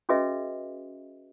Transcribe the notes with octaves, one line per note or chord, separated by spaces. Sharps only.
C#4 F#4 G#4 B4 D#5 E5